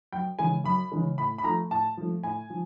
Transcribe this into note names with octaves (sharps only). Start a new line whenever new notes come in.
F#2 G5
C#3 E3 G#3 G#5
F#2 B5
C#3 E3 G#3
A2 B5
B5
F3 A3 A#5
A2 A5
F3 A3
A2 G#5
F3